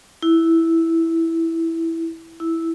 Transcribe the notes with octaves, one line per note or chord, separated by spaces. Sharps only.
E4
E4